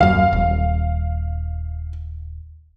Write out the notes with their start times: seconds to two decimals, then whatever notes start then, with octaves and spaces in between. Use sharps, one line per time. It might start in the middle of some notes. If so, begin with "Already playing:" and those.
0.01 D#1 F#2 F5
0.33 D#1